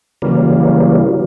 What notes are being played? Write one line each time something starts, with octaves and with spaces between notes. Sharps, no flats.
C#3 E3 F#3 G3 A#3